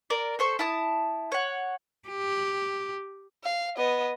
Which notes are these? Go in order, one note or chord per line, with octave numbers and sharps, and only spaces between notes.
A#4 D5
A4 C5 C#6
E4 A5 D#6
C#5 F#5
G4
F5
B3 D#5